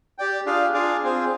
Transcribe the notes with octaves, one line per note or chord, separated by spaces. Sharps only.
G4 D5 G5
D4 F4 G#4 D5 F5
D4 F4 G#4 D5 F5
C4 F4 G#4 C5